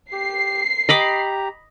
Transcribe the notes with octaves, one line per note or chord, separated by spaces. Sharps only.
G4 C7
G4 D#5 A#5 B5 D6